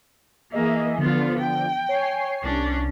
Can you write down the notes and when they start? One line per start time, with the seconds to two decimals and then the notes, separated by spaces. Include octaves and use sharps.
0.52 E3 A#3 G#4 D#5 E5
0.98 D3 F3 B3 F4
1.40 G5
1.89 C#5 G#5 C7
2.43 C2 C#4 D4